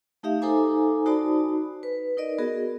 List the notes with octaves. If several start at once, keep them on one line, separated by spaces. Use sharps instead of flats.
A3 D#4 G4 E5 F5
D#4 A4 C5 G#5 A#5 D6
D#4 F#4 C5 D5 A5 B5
B4
D#4 A#4 D5 D#5
B3 F#4 G#4 A#4